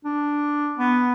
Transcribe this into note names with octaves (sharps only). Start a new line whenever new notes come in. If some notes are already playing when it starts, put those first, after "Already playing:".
D4
B3